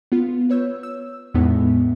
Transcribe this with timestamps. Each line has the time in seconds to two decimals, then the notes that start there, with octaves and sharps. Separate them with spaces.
0.12 B3 F4
0.50 B4 C#5 E6 G6
0.83 E6
1.34 E2 A2 G#3 B3 D#4